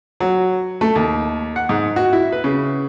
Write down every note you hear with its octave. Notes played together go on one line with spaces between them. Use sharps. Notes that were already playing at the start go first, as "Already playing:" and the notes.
F#3
A3
D#2
F#5
G#2
F#4
E4
B4
C#3